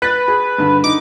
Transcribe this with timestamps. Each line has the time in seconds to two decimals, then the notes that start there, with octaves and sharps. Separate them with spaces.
0.02 B4 F#6 A6
0.28 G#4
0.58 G2 D3
0.84 D3 D#4 D6